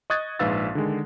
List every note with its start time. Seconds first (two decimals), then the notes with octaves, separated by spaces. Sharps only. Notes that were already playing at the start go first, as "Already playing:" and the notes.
0.10 D#5 C#6 D#6 F#6 G#6 A6
0.39 A#1 G#2 B4 F5 E6 A6
0.75 D3 D#3 G#3